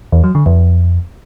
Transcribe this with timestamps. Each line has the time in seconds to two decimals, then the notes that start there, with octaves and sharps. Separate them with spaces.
0.12 E2
0.24 F#3
0.35 D3
0.46 F2